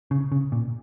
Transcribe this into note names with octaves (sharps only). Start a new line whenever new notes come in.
C#3
C#3
A#2